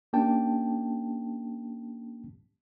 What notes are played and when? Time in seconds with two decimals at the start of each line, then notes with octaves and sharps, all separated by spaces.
0.13 A#3 C#4 D4 G4 G5 A5